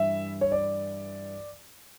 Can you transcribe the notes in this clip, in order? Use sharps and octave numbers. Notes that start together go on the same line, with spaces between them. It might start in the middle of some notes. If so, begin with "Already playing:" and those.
Already playing: G2 E3 E5
C#5
D5